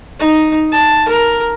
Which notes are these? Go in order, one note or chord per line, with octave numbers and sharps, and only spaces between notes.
D#4
A5
A#4